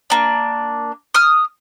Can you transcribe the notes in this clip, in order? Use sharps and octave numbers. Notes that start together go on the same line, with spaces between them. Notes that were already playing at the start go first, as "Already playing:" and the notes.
A#3 D4
D#6 F6